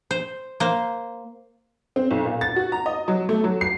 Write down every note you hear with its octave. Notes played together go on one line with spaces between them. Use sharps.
C5
A#3 C5
C4
B1
A#2
A6
F#4
A#5
D#5
F#3
A3
F#3
C7